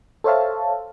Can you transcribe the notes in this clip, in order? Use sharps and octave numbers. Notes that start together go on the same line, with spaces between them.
A4 C5 C#5 E5 F5 A5